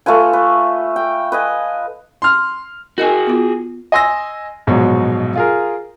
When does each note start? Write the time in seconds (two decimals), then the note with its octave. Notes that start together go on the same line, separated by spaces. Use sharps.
0.06 A3 F4 B4 G#5
0.33 B4
0.96 G5
1.32 B4 D#5 G#5
2.22 C6 F6
2.98 F#4 G#4 A#4 D#5 G#5
3.27 B3 F4
3.92 D#5 G#5 C6 E6 A#6
4.67 A#1 G#2 B2 F#3
5.35 F4 G#4 A#4